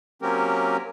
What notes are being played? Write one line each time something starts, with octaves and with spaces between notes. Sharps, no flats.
F#3 A#3 C4 C#4 G4 A#4